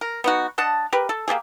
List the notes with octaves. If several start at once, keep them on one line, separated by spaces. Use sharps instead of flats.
A#4
B3 D#4 F#4
D4 D#5 F#5 A5
G4 A#4 B4
A4
A#3 D4 G4 G#4